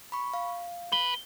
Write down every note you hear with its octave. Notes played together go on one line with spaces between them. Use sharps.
B5 C#6
F5
B4 G7